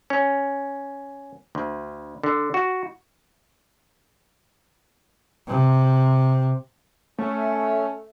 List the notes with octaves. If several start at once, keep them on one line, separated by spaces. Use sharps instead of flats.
C#4
D2
D3
F#4
C3
A3 C#4